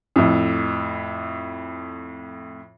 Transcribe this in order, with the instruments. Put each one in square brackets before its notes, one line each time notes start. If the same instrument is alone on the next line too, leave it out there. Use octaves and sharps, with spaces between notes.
[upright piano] F2 A2